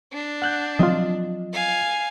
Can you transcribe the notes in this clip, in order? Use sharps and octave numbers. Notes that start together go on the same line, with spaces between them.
D4
F#5 F#6 G6
F3 F#3 C4 F4 D#5
F5 G#5